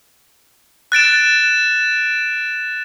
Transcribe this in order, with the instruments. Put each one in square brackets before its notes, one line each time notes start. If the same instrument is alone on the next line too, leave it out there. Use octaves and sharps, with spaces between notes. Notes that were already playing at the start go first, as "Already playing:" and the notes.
[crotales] F#6 A6 D7 E7